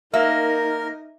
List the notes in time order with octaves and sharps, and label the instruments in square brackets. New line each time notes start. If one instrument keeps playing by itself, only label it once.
[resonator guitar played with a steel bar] A#3 [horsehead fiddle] D#4 [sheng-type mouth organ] A#4 [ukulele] E5